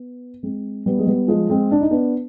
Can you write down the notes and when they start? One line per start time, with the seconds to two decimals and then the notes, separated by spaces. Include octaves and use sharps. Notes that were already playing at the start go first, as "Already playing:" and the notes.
Already playing: B3
0.43 G#3 C4
0.86 G3 B3
0.99 G#3
1.07 G3 B3
1.28 F3 G#3
1.50 G#3 C4
1.71 D4
1.81 D#4
1.91 B3 D4